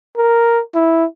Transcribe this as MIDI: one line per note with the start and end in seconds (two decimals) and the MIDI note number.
0.17 0.60 70
0.75 1.05 64